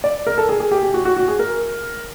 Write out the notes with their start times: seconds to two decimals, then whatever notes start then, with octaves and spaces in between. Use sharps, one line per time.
0.04 D5
0.27 A#4
0.38 A4
0.49 G#4
0.60 G#4
0.71 G4
0.83 G4
0.94 F#4
1.05 F#4
1.17 F#4
1.28 G#4
1.39 A#4